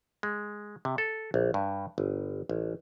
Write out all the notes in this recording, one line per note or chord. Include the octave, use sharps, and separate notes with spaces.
G#3
C3
A4
A#1
G2
G1
A1